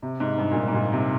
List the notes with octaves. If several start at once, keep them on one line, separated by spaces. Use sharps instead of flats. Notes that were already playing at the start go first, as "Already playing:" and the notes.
C3
G#2
G2
A#2
G#2
G#2
A#2
C3